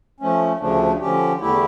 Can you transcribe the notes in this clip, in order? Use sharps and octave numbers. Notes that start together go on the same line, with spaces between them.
F3 A3 C#4
D2 C#3 F3 A3 D4
D3 F3 C#4 G4
E2 D3 A3 E4 G4